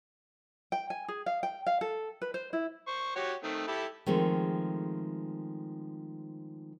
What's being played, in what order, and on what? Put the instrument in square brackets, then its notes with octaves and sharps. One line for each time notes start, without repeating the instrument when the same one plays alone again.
[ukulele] G5
G#5
G#4
F5
G5
F5
A4
B4
C5
E4
[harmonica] C5 C#6
F#4 G4 C#5
D#3 A3 C4
E4 G4 A4
[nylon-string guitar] D#3 F3 G#3 A3 C4